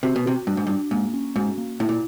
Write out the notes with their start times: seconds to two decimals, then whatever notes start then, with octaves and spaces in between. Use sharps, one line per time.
0.03 C3 F#4
0.16 B2
0.26 C3 F#4
0.47 G2 D4
0.57 G#2
0.67 G2
0.69 D4
0.91 G#2 A#3
1.14 C#4
1.36 G#2 F#4
1.58 A#3
1.80 A2 E4
1.89 A#2